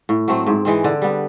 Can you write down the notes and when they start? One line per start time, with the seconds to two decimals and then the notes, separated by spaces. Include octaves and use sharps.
0.09 A2
0.28 F#3 A3 C4
0.47 G#2
0.65 E3 G#3 C4
0.84 D3
1.02 G3 B3